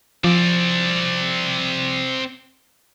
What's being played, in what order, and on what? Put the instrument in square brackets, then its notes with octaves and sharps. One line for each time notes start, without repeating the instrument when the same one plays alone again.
[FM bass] F3 [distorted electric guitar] C4 D5